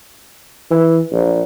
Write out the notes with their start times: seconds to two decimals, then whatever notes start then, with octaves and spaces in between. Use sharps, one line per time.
0.71 E3
1.12 A#1